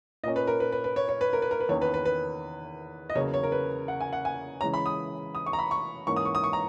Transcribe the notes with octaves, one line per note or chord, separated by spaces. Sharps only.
A#2 A#3 C#4 D#5
B4
A#4
B4
B4
B4
C#5
C#5
B4
A#4
B4
A#4
B4
E2 D#3 A#3 C#4 C#5
B4
B4
B4
D#5
E2 C#3 F#3 A#3 C#4 C#5
C#5
A#4
B4
F#5
G#5
F#5
G#5
C#3 E3 G#3 C#4 A#5
B5
D#6
D#6
C#6
A#5
B5
C#6
G#2 E3 A#3 C#4 C#6
D#6
C#6
D#6
C#6
A#5